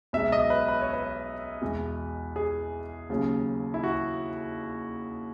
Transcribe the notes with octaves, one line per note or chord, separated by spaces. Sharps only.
B1 B2 G#3 E5
D#5
B4
B4
C#5
B4
E2 B2 G#3
G#4
D#2 C#3 F#3
E4
F#4